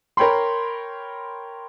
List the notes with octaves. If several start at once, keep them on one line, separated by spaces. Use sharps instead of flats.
A#4 C#5 G5 B5 C6